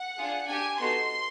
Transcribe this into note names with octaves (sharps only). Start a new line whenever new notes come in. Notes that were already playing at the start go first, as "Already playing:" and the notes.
Already playing: F#5
D4 F4 G#4
D4 G4 G#5
B3 D#4 F#4 A4 C6